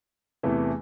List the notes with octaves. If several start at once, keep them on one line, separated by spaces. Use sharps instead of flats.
E2 C3 E3 A3